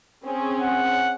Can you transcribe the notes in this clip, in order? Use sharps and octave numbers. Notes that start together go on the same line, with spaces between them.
C4 C#4 G#4
F#5